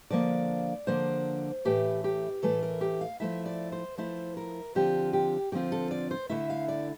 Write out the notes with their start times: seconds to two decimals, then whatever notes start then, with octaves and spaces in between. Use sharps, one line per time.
0.10 D3 F3 A#3 D5
0.87 D3 F3 A#3 C5
1.65 A2 E3 A3 G4
2.04 G4
2.43 A2 E3 A3 A4
2.63 A#4
2.81 G4
3.01 F5
3.20 F3 A3 E4 E5
3.46 D5
3.72 C5
3.98 F3 A3 E4 C5
4.37 A#4
4.75 D3 F3 C4 F4 G4
5.13 G4
5.52 D3 F3 C4 F4 G4
5.72 A4
5.91 D5
6.11 C5
6.29 D3 A3 E4 E5
6.50 F5
6.68 D5